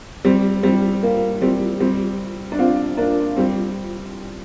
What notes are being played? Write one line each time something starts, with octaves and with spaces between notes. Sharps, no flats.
G3 C4
G3 C4
A#3
G3 C4
G3 C4
D4
C4 F4
A#3 D4
G3 C4